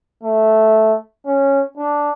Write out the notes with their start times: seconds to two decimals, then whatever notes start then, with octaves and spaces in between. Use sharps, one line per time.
0.23 A3
1.26 C#4
1.77 D4